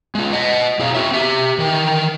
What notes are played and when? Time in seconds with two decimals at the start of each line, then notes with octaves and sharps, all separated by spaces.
0.15 G#3 F4
0.33 D#5 F#5
0.79 B2 E4 G#4 C#5 F5 A#5
0.95 C4 F#4 E5
1.14 G4 E5
1.58 D#3 E3 A#4 G5